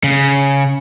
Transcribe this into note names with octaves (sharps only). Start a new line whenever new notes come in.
C#3